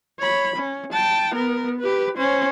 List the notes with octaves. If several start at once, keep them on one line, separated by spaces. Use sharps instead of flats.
C#5 B5
C#4
G5 A5
B3 A#4
G4 B4
C#4 C5